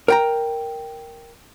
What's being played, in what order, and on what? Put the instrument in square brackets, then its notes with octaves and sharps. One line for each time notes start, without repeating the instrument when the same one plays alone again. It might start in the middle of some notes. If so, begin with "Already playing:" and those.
[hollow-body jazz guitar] A#4 G5 A#5